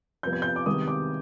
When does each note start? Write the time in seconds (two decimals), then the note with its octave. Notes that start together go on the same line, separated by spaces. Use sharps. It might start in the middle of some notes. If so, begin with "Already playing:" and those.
0.23 F2 C3 F3 B3 G6
0.33 G#6
0.42 G6
0.56 D6
0.66 C2 C3 D#3 G#3 B3 D#6
0.88 D6